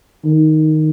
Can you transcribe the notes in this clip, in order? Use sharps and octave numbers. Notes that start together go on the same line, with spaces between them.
D#3